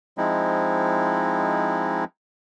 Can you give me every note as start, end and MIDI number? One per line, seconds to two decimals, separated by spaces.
0.18 2.04 53
0.18 2.04 56
0.18 2.04 60
0.18 2.04 63
0.18 2.04 64